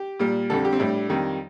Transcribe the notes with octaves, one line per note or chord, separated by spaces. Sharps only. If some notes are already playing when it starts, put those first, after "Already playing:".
Already playing: G4
A#2 G3
F2 D3 G3 A4
G4
C4
A2 G3 D4
F2 D#3 G3